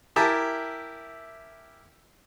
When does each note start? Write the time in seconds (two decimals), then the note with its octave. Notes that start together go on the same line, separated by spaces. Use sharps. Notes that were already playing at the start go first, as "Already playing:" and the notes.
0.16 E4 G4 A#4 E5 G#5 A5